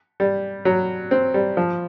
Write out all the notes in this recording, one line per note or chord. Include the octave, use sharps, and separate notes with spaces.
G3
F#3
C4
G3
F3